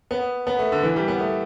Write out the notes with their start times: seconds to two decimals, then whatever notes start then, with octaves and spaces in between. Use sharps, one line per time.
0.11 B3
0.47 B3
0.59 A3
0.72 D3
0.83 E3
0.96 G3
1.08 B3
1.20 A3